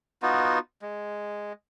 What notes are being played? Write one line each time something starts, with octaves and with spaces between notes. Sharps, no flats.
B3 D#4 F4 F#4
G#3